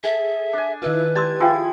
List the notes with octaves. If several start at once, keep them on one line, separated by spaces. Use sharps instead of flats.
G#4 A4 E5
D4 G#5
D#3 E4 F4 B4
G4 D5 A5 C6 E6 G#6
F3 G#3 E4 F4 G5